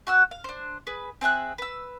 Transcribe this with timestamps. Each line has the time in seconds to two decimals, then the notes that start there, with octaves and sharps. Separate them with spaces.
0.07 F#4 F#5 E6
0.31 F5
0.44 D4 C5
0.87 G#4 B4
1.21 C4 G#4 E5 F#6
1.58 B4 E6